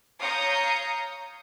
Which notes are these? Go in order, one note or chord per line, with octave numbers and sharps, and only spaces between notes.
C#5 F5 A#5 D#6 G6 C#7